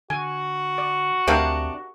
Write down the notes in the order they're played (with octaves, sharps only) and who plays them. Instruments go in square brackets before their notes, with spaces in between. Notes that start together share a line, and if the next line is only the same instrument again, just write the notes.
[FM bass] D3 [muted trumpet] F#4 [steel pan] G#5
[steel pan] D5
[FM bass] D2 [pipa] C3 D4 [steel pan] G4 A#4 F5